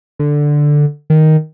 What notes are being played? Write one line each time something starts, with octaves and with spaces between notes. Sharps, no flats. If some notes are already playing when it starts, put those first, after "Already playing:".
D3
D#3